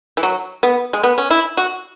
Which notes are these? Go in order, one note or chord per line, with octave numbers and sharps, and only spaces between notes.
E3
F#3
B3
G#3
B3
C#4
E4
F#4